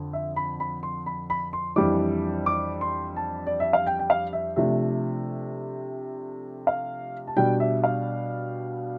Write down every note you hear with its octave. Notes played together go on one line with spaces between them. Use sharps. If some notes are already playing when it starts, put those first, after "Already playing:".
Already playing: F2 D3
E5
B5
B5
C6
B5
B5
C6
F2 E3 G3 D4 D6
D6
C6
A5
D5
E5
F5
G5
G5
F5
E5
C3 F3 A3 D4 E5
F5
A5
B2 G3 D4 G5
E5
F5